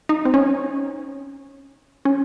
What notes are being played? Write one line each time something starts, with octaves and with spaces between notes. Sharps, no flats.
D#4
C4
C#4
C#4